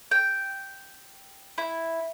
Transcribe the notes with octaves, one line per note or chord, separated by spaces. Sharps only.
G5
E4